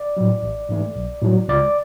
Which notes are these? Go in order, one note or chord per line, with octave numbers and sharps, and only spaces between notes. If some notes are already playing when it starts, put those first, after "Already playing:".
Already playing: D5
A2 F#3
A1
G#2 E3 A3
B1
A2 F#3
C#2 D5